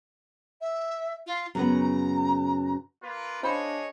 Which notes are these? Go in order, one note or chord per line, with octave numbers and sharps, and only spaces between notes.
E5
F4
F#2 C#3 B3 A#5
A#3 F4 B4
D4 F4 G#4 C5 C#5 D#5 B5